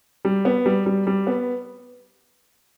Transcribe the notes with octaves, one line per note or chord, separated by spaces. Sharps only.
G3
B3
G3
G3
G3
B3